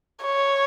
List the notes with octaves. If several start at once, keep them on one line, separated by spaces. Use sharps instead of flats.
C#5